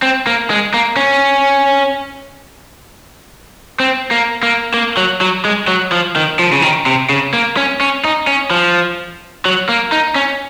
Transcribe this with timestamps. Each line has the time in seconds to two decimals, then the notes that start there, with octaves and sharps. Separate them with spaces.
0.02 C4
0.27 A#3
0.50 G#3
0.74 A#3
0.97 C#4
3.80 C4
4.11 A#3
4.43 A#3
4.74 A#3
4.97 F#3
5.21 F#3
5.45 G#3
5.68 F#3
5.92 F3
6.16 D#3
6.39 F3
6.52 C#3
6.62 D#3
6.86 C3
7.09 C#3
7.34 A#3
7.57 C#4
7.81 C#4
8.04 D#4
8.27 C#4
8.51 F3
9.46 F#3
9.69 A#3
9.92 D#4
10.15 C#4